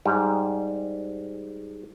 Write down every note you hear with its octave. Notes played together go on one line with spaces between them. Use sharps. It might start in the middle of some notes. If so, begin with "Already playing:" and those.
G#2 G3